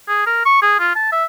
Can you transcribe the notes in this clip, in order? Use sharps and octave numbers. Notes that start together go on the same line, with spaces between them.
G#4
A#4
C#6
G#4
F4
A5
E5